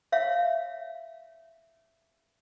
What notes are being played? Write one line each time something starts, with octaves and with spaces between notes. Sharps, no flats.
C#5 E5 F5